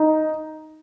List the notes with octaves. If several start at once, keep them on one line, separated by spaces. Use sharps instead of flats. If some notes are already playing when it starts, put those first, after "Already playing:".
Already playing: D#4